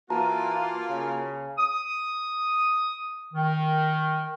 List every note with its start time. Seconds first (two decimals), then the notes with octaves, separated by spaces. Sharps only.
0.10 E3 A#3 F4 F#4 A5 A#5
0.89 C#3
1.58 D#6
3.34 D#3